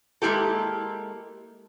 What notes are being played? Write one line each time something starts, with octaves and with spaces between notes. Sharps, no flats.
G#3 A#3 E4 G4 A4